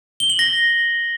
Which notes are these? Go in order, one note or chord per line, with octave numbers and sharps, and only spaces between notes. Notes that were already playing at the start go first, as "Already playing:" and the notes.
G7
F#7
A#6